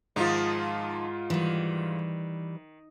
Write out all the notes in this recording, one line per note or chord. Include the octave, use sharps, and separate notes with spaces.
G#2 D#3 F3 D#4 F4
D#3 E3 G3